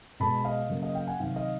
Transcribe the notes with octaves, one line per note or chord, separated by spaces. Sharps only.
B2 G#3 A5 B5
D#5 F5
C#3 F#3 A#3
D#5 F5
F5 G5
F#5 G#5
C3 D#3 F#3 F5 G5
D#5 F5